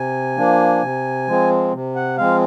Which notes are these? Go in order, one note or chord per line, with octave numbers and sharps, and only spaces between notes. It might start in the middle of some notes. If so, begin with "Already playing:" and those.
Already playing: C3 G#5
F3 A#3 D4
C3
F3 G#3 C4
C3
F#5
F3 G#3 C4 F5